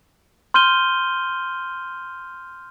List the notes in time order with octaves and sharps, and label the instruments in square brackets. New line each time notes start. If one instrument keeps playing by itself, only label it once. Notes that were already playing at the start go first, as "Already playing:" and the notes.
[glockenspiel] C6 F6 G6 D#7 G7